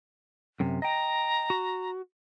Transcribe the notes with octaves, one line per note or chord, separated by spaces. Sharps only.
F#2 C3
D#5 G5 A#5
F#4